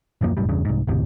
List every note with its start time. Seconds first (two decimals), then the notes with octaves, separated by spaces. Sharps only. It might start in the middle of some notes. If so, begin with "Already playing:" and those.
0.21 D#1 F#2 F3 A#3
0.37 F1 F#2 A2 G3
0.49 E2 G2 C#3
0.65 C2 G#2
0.87 F#1 D#2 A2 C3